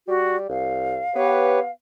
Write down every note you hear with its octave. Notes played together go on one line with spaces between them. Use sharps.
G3 F#4
C2 F5
B3 G4 B4 C#5